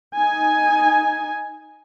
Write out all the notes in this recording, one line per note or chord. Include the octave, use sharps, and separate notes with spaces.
D#4 G#5